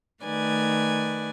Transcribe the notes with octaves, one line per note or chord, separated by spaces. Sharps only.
D#3 A3 B4 D5 G#5